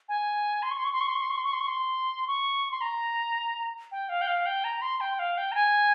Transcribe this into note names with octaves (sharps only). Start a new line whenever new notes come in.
G#5
C6
C#6
C6
C#6
C6
C#6
C6
C#6
C6
C#6
C6
C#6
C6
C#6
C6
C#6
C6
A#5
G5
F5
G5
F5
G5
A#5
C6
G5
F5
G5
A#5
G#5